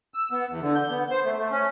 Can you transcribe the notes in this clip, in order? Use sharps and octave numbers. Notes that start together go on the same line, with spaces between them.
E6
B3
E2
D3
G6
B3
C5
A3
A3
C#4